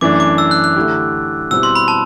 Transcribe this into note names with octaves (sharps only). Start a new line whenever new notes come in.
F#2 E3 A3 D4 D6
D6
E6
F#6
F#6
D3 A3 E4 G4
B2 G3 C4 E4 E6
C6
B5
A5